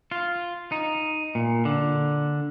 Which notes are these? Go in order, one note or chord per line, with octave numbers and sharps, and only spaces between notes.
F4
D#4
A#2
D3